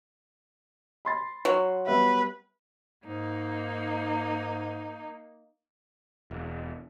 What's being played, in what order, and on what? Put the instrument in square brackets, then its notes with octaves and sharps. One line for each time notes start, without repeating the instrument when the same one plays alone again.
[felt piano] B5 C6 A6
[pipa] F#3
[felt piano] G3 B3 E5 [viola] B4
[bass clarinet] G#2 [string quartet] A#3 D#4
[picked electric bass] E1